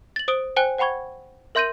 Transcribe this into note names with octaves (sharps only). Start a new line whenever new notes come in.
A6 F#7
C5 D#6 D7 G7
C5 G5 G#5 F#6 G7
C5 F#5 G5 B5 C#6 G#6
A#4 E5 C6 G6 A#6 D#7